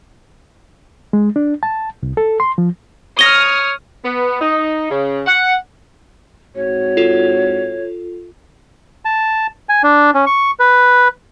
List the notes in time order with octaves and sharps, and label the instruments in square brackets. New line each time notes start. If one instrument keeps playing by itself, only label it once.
[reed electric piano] G#3
D4
A5
C2
A4
C6
F3
[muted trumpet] C#5 [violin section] D#6 F6 [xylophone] A#6 G7
[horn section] B3
D#4
C#3
F#5
[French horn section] G#2 C4 F#4 [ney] C#5
[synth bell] F4 A4
[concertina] A5
G#5
D4
C#4
C#6
B4